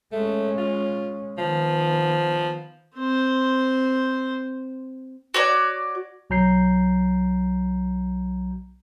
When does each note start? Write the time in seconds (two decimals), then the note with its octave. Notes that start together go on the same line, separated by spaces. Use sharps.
0.12 G#3 A3 C#4
0.58 F4
1.38 D#3 F3 B3
2.96 C4 C5
5.34 F#4 C#5 D5
6.30 B1 F#3 A#5 G6 C7